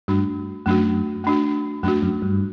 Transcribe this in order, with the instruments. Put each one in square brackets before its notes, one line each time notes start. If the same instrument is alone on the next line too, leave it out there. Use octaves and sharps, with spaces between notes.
[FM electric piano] G2 [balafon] A3 D4 F#4
[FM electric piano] F#2 [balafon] A3 D4 F#4
[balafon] A3 D4 F#4
[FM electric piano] F#2 [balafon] A3 D4 F#4
[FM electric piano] F#2
G2